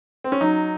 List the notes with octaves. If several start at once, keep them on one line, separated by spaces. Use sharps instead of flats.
C4
C#4
F#3 D#4